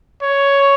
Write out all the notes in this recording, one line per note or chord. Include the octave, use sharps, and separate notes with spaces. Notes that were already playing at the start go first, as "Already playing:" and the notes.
C#5